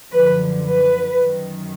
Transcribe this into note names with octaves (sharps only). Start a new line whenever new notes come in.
F#2 D3 F3 B4
B4
F#2 D#3